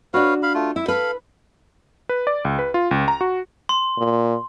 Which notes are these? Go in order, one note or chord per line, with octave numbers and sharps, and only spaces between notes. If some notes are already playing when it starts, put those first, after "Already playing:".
D4 F#4 B4 C#5 F5
F5 B5
A3 F4
E4 E5
A4 B4 F5 B5
B4
D5
C#2
B4
F4
C#2
A#5
F#4
C6
A#2